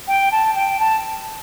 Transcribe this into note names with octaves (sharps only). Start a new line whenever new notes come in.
G5
A5
G5
A5